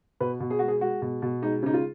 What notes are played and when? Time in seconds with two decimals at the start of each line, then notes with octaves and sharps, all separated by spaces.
0.20 B2 B4
0.40 B2
0.50 G#4
0.59 G#3 F#4
0.68 G#4
0.81 G#3 F#4
1.02 B2
1.22 B2
1.42 G#3 D#4
1.63 C#3 D#4
1.73 F4